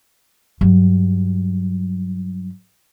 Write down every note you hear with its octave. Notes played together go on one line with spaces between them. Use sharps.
G2 F#3